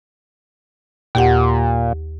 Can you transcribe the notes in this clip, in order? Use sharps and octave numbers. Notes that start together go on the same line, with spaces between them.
D#2 A#2 G4 F#5